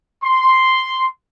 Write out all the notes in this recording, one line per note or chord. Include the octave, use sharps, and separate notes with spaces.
C6